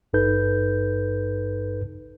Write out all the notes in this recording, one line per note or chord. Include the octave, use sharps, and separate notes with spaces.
G#1 G2 D#4 A4 B4 G6